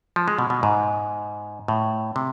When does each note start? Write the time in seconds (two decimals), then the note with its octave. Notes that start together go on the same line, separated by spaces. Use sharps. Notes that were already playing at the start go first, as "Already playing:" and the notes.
0.16 F3
0.28 G#3
0.38 B2
0.50 B2
0.63 G#2
1.68 A2
2.16 C3